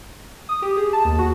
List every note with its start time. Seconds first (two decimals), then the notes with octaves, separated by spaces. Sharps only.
0.49 D#6
0.62 G4
0.77 G#4
0.93 A5
1.05 D#2
1.19 F#4